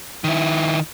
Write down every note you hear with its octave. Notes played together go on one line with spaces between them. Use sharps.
D#3 E4